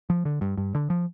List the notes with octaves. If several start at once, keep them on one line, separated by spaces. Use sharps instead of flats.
F3
D3
G2
G2
D3
F3